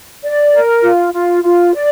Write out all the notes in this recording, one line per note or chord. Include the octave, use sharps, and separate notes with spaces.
D5
A#4
F4
F4
F4
D5